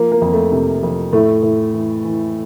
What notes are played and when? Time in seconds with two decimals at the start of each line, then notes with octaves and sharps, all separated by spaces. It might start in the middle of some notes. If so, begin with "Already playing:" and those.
Already playing: F3 A#3
0.12 A#3
0.21 F2
0.32 A3
0.52 C3
0.83 F2
1.13 A2 A3
1.43 A2
1.74 E3
2.04 E3